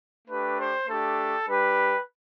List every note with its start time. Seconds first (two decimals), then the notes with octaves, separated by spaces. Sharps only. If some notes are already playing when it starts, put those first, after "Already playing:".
0.28 A3 D4 G4 B4
0.58 C5
0.87 A3 D4 G4 A4
1.47 G3 D4 G4 B4